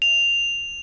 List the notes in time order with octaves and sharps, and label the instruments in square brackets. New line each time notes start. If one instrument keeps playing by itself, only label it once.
[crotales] F7